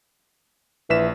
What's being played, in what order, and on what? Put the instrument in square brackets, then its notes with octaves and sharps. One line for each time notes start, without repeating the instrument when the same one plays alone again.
[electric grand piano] A#1 B6 E7 [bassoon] E3